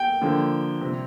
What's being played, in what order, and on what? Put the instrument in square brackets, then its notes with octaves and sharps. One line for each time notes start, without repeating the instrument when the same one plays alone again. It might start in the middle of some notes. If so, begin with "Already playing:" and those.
Already playing: [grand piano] G5
D3 F3 A#3
C3 G3 C4